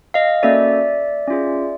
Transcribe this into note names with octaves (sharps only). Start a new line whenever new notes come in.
D#5 F5
A#3 C#4 F#4 A4 D5 E5
C#4 F4 G#4